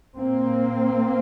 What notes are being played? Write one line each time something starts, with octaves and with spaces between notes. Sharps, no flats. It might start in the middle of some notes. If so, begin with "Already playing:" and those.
A#2 A#3 C4